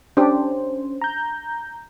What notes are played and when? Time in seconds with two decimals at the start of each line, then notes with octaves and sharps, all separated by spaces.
0.17 C#4 D4 G4 C5
1.01 A#5 G6